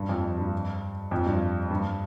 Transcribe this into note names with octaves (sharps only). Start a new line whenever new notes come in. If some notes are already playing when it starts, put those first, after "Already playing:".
Already playing: G2
F2
G2
F2
G2
G2